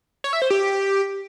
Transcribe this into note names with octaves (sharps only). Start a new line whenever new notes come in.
C#5
E5
C5
G4